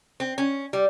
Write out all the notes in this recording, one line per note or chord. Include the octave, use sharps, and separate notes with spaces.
C4
C#4
G3